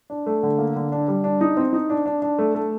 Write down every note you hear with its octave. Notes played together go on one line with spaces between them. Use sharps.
D4
A3
D3
A#3
D3
D4
G3
D4
D#4
C4
D#4
D4
D4
D4
A3
A3